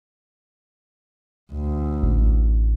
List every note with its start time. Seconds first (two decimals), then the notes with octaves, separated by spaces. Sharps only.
1.53 D2
2.03 A1